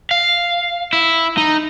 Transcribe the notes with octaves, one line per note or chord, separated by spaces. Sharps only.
F5
E4
D#4